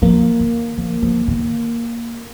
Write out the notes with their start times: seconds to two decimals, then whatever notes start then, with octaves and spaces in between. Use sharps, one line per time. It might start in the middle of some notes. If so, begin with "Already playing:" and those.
0.02 F3 A#3
0.40 D#3
0.78 F3
1.02 F3
1.28 D#3